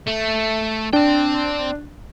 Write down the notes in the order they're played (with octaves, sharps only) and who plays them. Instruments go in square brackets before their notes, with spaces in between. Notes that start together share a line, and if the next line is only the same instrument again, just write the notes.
[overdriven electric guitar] A3
[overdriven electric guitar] C4 G5 [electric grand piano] D4